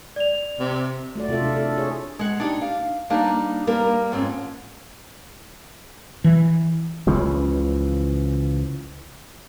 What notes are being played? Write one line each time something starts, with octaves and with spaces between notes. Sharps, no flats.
D5 F7
C3
A3 F#4 D5
C3 F4 A4 E5
D4 E4
A4
G#4 C#5
G#3 F#5
D4 D#4 G4
F5
G3 A#3 D4 D#4
G3 A#3 A#4
F2 G#2 C4 C#4
E3
C#2 C#3 E3 F3